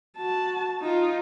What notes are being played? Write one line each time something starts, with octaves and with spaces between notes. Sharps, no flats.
F#4 A5
D#4 F4